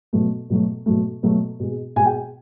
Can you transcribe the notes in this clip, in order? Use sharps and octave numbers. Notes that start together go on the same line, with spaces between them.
B2 F#3 A3
B2 F#3 A3
B2 F#3 A3
B2 F#3 A3
B2 G#3
B2 G#3 G#5
G5